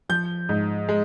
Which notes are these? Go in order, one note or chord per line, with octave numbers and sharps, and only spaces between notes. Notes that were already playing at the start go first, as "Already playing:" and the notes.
F3 G6
G#2
G#3